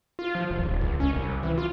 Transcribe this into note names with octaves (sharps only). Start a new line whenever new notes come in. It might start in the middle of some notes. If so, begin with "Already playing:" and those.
F4
F3
E1
D#1
C#2
C#4
C2
E3
F4